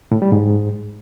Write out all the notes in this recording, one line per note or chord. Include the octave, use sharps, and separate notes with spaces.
A2
G3
G#2